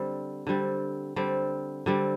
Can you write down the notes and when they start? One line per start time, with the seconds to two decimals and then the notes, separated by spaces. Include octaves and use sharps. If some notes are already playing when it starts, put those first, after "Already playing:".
Already playing: D3 G3 C4
0.47 D3 G3 C4
1.16 D3 G3 C4
1.86 D3 G3 C4